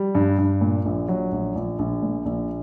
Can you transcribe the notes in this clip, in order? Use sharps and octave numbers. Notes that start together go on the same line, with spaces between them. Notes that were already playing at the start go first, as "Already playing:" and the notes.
Already playing: G3
G2
G2
A#2
A#1
F#3
A#1
A#1
A#1
A#2
A#1